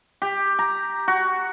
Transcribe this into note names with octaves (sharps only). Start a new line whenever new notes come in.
G4
A#5
F#4